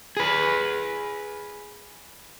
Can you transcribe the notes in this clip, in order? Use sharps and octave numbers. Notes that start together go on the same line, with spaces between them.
G#4 B4